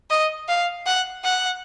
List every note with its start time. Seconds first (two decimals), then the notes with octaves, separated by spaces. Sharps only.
0.10 D#5
0.48 F5
0.86 F#5
1.24 F#5